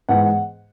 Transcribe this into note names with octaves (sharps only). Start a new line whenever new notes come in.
G#2 E3 B3 F#5